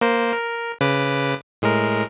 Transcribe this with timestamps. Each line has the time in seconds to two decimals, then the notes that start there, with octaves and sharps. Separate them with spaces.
0.01 A#3 A#4 C5
0.32 A#4
0.81 C#3 B4 D6
1.62 A2 G#3 A#4